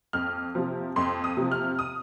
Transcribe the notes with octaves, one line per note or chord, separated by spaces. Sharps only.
F2 F6
C3 F3
F2 C6
D#6
C3 F3
F6
D#6